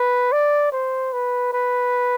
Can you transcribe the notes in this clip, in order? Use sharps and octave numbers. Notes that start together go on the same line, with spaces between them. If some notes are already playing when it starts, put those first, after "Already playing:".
Already playing: B4
D5
C5
B4
B4